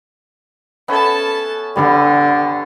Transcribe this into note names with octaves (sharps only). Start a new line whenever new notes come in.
B3 C#4 A4 E5 A5
D3 G3 B3 A4